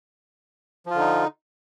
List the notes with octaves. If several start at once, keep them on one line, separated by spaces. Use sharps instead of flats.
D3 F3 D#4 F4